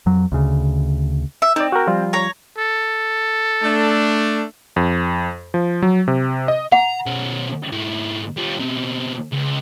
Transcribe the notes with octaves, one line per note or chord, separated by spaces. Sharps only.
F2 F#3
D2 C#3
E5
C4 D#4 D5
F#4 A#4
F3 G3 F4
C#5 A#5
A4
A3 D4
F2
F3
F#3
C3
D#5
F#5 A#5
B2 C#4
G#2 E4
G3 F4
B2 C4
C#2